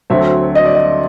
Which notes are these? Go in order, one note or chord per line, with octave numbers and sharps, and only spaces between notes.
D2 D3 F#3 A3 C4 E5
D#5
D5
D#5